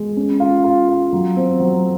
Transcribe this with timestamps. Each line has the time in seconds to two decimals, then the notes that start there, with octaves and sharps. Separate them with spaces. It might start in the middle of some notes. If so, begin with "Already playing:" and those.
Already playing: G#3
0.17 C#4
0.40 F4
0.64 F4
0.88 F4
1.13 F#3
1.36 C4
1.60 F#3